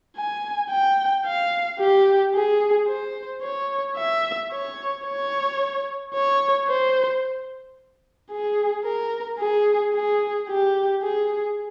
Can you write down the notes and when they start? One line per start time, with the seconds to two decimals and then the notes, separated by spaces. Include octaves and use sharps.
0.17 G#5
0.71 G5
1.25 F5
1.80 G4
2.35 G#4
2.88 C5
3.43 C#5
3.97 E5
4.52 C#5
5.06 C#5
6.15 C#5
6.68 C5
8.31 G#4
8.85 A#4
9.39 G#4
9.94 G#4
10.49 G4
11.03 G#4